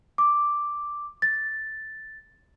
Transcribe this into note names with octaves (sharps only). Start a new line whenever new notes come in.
D6
A6